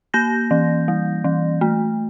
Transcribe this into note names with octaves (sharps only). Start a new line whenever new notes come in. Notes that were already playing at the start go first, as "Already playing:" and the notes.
A#3 G6 A#6
E3
G3
E3
A3